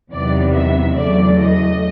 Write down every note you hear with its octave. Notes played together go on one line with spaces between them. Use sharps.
E2 C3 D#3 F#3 B3 D5
E5
E2 C#3 F#3 A3 D5
D#5